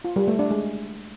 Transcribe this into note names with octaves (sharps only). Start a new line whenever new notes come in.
F4
G3
A3
D4
G#3